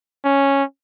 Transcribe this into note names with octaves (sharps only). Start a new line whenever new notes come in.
C#4